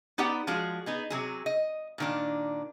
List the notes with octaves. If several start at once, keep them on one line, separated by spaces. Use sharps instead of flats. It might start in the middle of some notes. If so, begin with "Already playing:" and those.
B3 D#4 G4 B4 D5 F#5
F3 G#3 F#4 G#4
B3 D#4 G#4
C3 F#3 G#4
D#5
A#2 D#3 D4